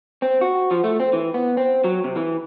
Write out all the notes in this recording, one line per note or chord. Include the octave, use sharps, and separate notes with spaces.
C4
F#4
F3
A3
C4
E3
B3
C4
F#3
C3
E3